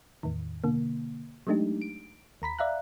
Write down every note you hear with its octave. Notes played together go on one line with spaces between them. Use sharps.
E2 A2 D#3
B2 D3 A#3
F#3 G#3 A3 D4 D#4 G4
D7
D#2 A#5 B5 B6
D5 E5 F5 A#5 F#6